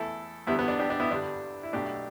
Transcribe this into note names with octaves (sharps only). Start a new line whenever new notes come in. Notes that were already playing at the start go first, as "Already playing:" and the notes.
Already playing: E2 E3 A3 E4 A4
E2 D3 G3 B3 E4
B3
D4
D4 G4
D4
B3 E4
G2 D3 G3 D4
E4
B1 B2 A3 D4 G4